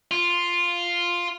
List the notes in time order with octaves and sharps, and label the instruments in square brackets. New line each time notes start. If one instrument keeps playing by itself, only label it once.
[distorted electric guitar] F4